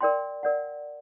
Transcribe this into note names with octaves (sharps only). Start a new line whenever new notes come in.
A#4 D5 G5 C6
A#4 D5 F#5